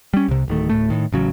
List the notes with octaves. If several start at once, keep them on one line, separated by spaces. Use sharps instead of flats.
G3 C#4
C2 C3
D1 D#3 A3
D1 A2 A3
A2 D#3
A1 C#3 F#3